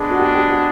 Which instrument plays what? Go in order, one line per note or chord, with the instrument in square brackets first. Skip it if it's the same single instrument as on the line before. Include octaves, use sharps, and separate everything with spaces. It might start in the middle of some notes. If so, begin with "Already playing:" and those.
Already playing: [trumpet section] G#3 B3 D4 [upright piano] G#4
[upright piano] F#4
G4
G4
F#4